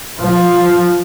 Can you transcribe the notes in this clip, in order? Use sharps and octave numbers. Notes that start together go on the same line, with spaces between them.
F3